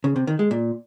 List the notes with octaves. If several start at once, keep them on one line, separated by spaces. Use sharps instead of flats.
C#3
C3
D#3
G#3
A#2